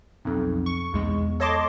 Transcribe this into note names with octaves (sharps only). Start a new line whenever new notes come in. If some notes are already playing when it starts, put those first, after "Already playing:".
B1 F2
C#6
B1 E2 G#3
A4 C#5 D#5 A5 C6 D6